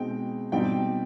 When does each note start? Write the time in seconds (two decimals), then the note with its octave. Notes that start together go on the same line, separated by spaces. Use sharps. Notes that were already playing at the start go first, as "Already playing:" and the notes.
Already playing: B2 G#3 C4 D#4 G5
0.52 B2 G3 C4 D#4 G5